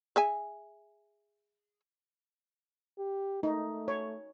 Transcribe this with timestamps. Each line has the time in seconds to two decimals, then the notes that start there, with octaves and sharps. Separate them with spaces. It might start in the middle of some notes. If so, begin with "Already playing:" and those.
0.16 G#4 E5 G#5
2.99 G4
3.43 A3 D#4
3.88 C#5